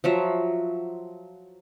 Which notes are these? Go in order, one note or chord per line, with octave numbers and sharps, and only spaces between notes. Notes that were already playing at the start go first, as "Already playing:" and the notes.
F3 F#3 E5